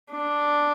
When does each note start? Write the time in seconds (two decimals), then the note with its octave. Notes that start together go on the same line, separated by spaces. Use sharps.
0.11 D4